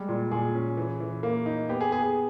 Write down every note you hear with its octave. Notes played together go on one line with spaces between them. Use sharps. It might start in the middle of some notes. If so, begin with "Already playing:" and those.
Already playing: G3 G#3
A#2
A#2 G#4
C#4
E3
E3
A#3
D#4
B3 G4
G#4
B3 G#4
G#4